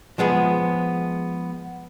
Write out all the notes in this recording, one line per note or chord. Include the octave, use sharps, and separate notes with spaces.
F3 G#3 B3 G#4